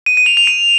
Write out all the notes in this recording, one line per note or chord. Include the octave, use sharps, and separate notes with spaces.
D#7
D#7
F7
F7
D#7